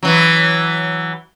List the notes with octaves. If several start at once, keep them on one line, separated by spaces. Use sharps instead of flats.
E3 F#3